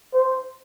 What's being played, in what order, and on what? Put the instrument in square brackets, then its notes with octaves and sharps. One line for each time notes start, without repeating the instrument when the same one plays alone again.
[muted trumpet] C5